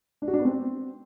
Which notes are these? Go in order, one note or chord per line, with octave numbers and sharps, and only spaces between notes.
D4
F#4
D4
B3
C4